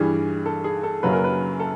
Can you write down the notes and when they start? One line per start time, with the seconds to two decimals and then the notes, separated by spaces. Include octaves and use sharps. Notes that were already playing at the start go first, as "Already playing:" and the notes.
Already playing: G2 E3 G3 G#4
0.46 A4
0.64 G#4
0.83 A4
1.03 F#2 C#3 F#3 A#3 B4
1.13 A#4
1.24 B4
1.60 A4